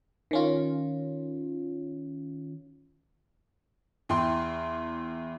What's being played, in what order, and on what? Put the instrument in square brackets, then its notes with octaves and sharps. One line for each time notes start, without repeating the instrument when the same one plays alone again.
[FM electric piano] D#3 C#4 F4
[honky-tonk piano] E2 E4 G5 C6